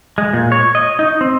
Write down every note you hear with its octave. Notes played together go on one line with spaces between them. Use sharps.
G#3
A#2
C#5
D#5
D#4
C4